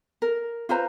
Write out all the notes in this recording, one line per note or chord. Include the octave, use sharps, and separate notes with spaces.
A#4
F4 B4 C5 A#5